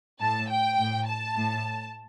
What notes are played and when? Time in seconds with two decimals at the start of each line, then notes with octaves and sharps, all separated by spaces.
0.20 A2 A5
0.49 G5
0.78 A2
1.07 A5
1.36 A2